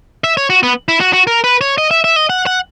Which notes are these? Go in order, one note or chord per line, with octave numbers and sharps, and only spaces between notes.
E5
C#5
F#4
B3
E4
F#4
F#4
A#4
B4
C#5
D#5
E5
E5
D#5
F#5
F#5